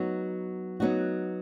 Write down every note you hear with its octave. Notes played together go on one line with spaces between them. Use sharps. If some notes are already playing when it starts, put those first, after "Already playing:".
Already playing: F#3 B3 D#4 F#4
F#3 B3 D#4 F#4